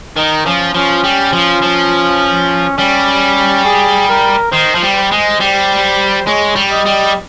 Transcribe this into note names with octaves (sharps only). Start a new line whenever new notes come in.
D#3 D#4
F3 C#4
F3 C#4
G3
F3
F3
G3 C#4
G#4
A#4
D#3 C5
F3
G3
C5
G#3
G3
G#3 C#5
G3
D#5
G3